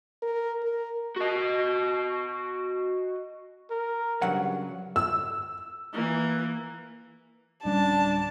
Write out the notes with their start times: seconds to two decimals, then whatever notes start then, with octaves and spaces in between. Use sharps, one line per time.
0.22 A#4
0.63 A#4
1.17 F#4 D#5
3.71 A#4
4.22 G2 C#3 F#3 F#5
4.96 E6
5.93 E3 A#3
7.65 D1 G3 C#4 D4 A5